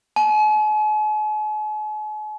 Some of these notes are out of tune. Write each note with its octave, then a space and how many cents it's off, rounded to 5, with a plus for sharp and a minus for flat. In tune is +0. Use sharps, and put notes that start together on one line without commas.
G#5 +45